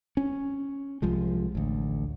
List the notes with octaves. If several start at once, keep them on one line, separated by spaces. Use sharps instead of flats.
C#4
C2 F3 G#3
A1 D2